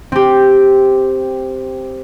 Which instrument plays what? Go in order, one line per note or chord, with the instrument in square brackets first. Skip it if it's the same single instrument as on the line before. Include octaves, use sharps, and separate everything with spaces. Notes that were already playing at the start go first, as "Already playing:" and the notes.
[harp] C4 G4